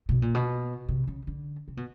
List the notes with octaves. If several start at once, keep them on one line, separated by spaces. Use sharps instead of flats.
B2
A#2
B2
C3
C#3
D3
C3
B2